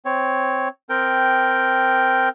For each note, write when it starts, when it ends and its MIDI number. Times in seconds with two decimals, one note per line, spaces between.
0.05 0.68 60
0.05 0.68 73
0.90 2.29 60
0.90 2.29 70
0.90 2.29 79